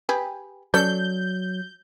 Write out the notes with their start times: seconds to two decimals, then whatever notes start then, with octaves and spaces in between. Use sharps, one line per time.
0.09 G4 G#4 B4
0.74 F#3 C#4 A4 D5 G6